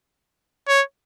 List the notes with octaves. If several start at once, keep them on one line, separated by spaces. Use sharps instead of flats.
C#5